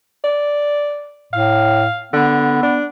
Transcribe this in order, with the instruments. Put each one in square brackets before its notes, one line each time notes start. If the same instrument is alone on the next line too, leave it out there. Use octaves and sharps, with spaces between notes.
[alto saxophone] D5
[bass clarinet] A2 [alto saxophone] F5
[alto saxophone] D3 [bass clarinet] B3
[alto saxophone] D4